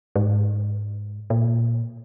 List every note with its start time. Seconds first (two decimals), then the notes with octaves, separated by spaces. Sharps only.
0.16 G#2
1.30 A#2